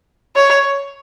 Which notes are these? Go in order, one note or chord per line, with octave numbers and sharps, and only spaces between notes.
C#5